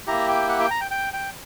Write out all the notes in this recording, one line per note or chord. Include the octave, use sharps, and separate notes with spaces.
A#3 E4 G4 A#5
G5
F#5
G5
A#5
G5
G5
G5